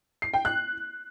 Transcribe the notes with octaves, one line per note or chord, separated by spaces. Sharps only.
C7
G5
F#6